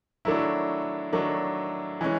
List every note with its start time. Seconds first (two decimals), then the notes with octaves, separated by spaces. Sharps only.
0.25 D#3 F#3 A3 D4 E4
1.13 D#3 F#3 A3 D4
2.01 E3 G#3 C#4